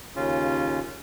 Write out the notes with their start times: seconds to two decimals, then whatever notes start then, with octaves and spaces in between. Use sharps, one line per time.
0.16 D#2 C#3 C#4 F4